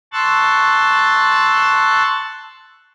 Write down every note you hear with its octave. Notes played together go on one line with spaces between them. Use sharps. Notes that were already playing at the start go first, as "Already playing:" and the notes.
A5 C6 C#6 E6 F#6 A6